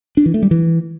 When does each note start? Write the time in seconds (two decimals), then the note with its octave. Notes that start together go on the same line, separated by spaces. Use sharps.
0.17 D4
0.26 E3
0.34 A3
0.43 G3
0.51 E3